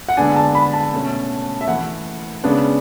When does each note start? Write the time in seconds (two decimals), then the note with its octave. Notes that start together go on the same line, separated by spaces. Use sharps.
0.09 F#5
0.17 D3 G#3 B3 D4 G#5
0.36 A5
0.55 B5
0.73 A5
0.93 B2 A3 C#4
1.61 E5
1.68 E3 A3 E4 F#5
2.44 C#3 G#3 B3 D4